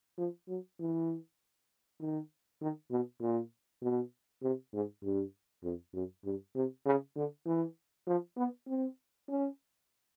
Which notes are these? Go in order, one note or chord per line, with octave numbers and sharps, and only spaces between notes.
F3
F#3
E3
D#3
D#3
B2
A#2
B2
C3
G#2
G2
F2
F#2
G2
C3
C#3
D3
E3
F3
B3
C4
C#4